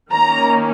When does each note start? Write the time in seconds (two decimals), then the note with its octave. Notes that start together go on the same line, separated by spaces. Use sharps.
0.12 D#3 A#3 C#4 A#5